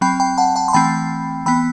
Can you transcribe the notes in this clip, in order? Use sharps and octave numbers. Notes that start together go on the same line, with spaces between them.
F#3 C4 G5 B5
G5 B5
F#5 A5
F#5 A5
C6
E3 A3 C4 G5 B5
E3 B3 G5 B5